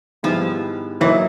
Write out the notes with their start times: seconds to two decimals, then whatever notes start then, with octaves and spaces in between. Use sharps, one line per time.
0.23 G#2 D#3 F3 G3 B3 E4
1.01 E3 F#3 A#3 D#4